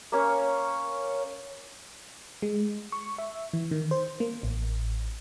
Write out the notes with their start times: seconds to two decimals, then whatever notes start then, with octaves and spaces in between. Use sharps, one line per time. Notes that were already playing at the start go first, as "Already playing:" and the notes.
0.12 A#3 C#4 C#5 F5
2.42 G#3
2.92 C#6
3.18 E5
3.53 E3
3.71 D#3
3.91 C5
4.20 A#3
4.43 A1